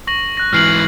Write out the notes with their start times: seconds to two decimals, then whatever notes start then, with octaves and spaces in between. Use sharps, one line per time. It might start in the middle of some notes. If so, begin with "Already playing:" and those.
0.07 C#6 A#6 F#7
0.37 F#6 A#6
0.53 G#2 E3 F6 C7 F#7